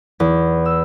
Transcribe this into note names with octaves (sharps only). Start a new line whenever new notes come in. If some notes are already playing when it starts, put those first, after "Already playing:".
E2
E6